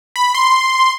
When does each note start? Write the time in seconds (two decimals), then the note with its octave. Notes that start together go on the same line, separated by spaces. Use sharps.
0.16 B5
0.34 C6